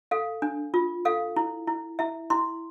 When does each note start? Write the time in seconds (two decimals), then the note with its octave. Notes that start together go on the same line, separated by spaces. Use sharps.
0.11 A4 F5
0.42 D4
0.74 F4
1.05 A4 F5
1.37 E4
1.67 E4
1.99 E4 E5
2.30 E4 C6